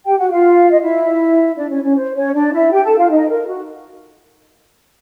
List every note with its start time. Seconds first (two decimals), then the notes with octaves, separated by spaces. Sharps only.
0.05 G4 G5
0.18 F#4 F#5
0.30 F4 F5
0.72 D#5
0.82 E4 E5
1.57 D4 D5
1.70 C#4 C#5
1.83 C#4 C#5
1.95 C5
2.14 C#4 C#5
2.33 D4 D5
2.53 E4 E5
2.72 G4 G5
2.84 A4 A5
2.97 F4 F5
3.10 D#4 D#5
3.29 A#4
3.48 F#4